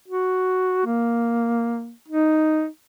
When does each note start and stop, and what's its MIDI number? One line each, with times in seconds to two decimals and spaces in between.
0.08 0.81 66
0.86 1.92 58
2.08 2.67 63